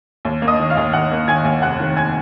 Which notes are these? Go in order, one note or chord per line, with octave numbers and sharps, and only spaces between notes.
D#2
A#3
D#5 D#6
D#3
F5 F6
D#2
D#2 F#5 F#6
A#3
D#3 G#5 G#6
D#2
F1 F#5 F#6
D#3
G#5 G#6